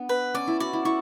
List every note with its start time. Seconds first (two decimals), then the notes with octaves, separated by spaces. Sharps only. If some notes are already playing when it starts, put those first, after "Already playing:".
Already playing: B3 D4
0.09 B4
0.34 C#4 D5
0.47 E4
0.60 F#4 D5
0.73 E4
0.85 E4 C#6